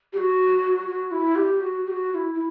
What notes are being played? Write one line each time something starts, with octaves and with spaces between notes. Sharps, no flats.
G4
F#4
F#4
E4
G4
F#4
G4
F#4
F#4
E4
E4